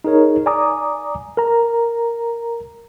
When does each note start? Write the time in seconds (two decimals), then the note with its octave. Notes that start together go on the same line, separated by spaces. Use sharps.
0.04 D#4 G#4 A#4 C#5
0.46 D5 G#5 A#5 D6 D#6
1.37 A#4 A#5